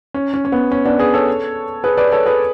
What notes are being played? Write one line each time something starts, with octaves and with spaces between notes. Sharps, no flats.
C#4
C#4
C#4
B3
C#4
B3 D4
G#4 B4
A4 C#5
G#4 B4
B4 D5
A4 C#5
G#4 B4